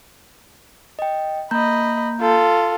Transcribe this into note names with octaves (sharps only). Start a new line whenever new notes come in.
D#5 G5
A#3 D#5 A#5 B5 G6
F4 A4